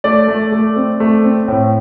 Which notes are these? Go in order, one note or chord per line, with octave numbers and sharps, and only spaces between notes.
A3 D5
A3
A3
C4
A3
C4
A2